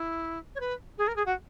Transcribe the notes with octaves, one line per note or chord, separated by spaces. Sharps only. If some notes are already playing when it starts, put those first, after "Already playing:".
Already playing: E4
C#5
B4
G#4
A#4
G#4
F#4